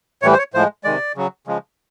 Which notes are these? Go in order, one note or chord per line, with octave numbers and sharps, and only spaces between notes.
A2 E3 G3 C#5
C5
C#5
A2 F3 G#3 C5
C3 D#3 G#3 D5
C#3 F#3
C#3 F3 G#3